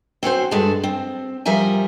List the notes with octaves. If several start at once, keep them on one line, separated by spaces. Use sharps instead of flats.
C4 C#4 F#4 C5
G2 G#3 D4 A4 A5
C4
F3 G3 A#4 E5 G#5